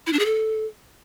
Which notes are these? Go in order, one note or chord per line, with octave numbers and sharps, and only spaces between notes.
E4
D4
G#4
A4